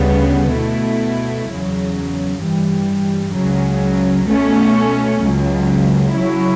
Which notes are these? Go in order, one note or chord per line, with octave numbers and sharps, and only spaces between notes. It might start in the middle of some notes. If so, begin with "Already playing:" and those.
Already playing: D2 C#3 G3 B3
B2 A3 E4
E2 C#3 F#3
G2 E3 G3
C#2 C#3 F#3
B2 A3 C#4
C#2 C#3 F#3
C#3 F#3 C#4 E4